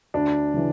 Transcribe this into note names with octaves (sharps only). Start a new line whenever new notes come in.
D2 D4
C#3 E3